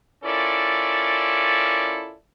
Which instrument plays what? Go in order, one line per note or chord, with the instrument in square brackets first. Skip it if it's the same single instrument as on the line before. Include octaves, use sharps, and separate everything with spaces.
[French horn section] C#4 E4 F4 A4 A#4 D5